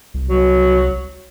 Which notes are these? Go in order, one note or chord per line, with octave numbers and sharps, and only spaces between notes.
C2
F#3